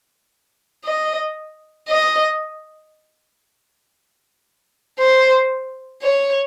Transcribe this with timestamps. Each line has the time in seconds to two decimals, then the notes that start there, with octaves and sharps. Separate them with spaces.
0.85 D#5
1.88 D#5
4.99 C5
6.02 C#5